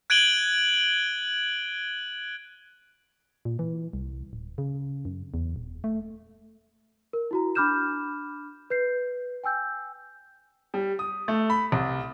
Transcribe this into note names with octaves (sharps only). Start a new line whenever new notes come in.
F#6 G#6 D7 D#7 F#7 G7
A#2
E3
C2
D1
C#3
F#2
E2
D#1
A3
A#4
E4 F#4 A#5
D4 B5 D6 F6 G6 E7
B4 G6 C7
G5 G#5 E6 G6
G3
D#6
A3
B5
C2